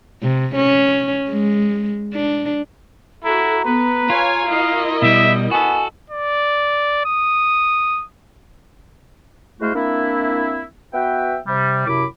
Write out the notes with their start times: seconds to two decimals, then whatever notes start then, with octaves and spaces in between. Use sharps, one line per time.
0.22 C3
0.55 C#4
1.30 G#3
2.14 D4
3.24 E4 F#4 A4 A#5
3.65 B3 B4
4.10 F4 C#5 F5 G#5
4.48 E4 A#4 D#5 F5
5.02 B2 G3 E5
5.51 B3 F#4 A4 G#5
6.10 D5
7.05 D#6
9.61 G#3 A3 E4 F#4 C5 F5
9.75 A#3 C4 D4 E4
10.94 B3 F#4 B4 E5 G5
11.47 C3 G3
11.87 F#2 C3 E4 B5 D6